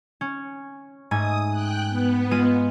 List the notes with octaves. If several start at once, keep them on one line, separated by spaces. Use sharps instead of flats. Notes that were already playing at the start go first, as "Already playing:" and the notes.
C#4
G#2 A3 G#5 D#6
G5 F#6
B3
G#3 F4 D#7